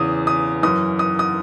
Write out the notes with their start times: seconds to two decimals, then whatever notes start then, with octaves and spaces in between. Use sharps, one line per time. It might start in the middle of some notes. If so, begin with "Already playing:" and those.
Already playing: E2 C#3 E3 D#6
0.27 D#6
0.63 F#2 E3 D#6
0.99 D#6
1.19 D#6